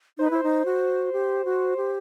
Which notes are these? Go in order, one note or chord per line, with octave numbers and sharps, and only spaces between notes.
D#4 C5
B4
E4 C5
D#4
F#4
G4
F#4
G4